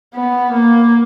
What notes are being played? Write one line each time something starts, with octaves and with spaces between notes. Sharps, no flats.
B3
A#3